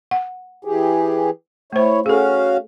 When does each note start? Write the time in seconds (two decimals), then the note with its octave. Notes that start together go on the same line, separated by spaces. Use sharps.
0.11 F#5
0.65 E3 G4 G#4
1.73 A3 E4 C5 C#5
2.06 C#4 F#4 G#4 A4 F5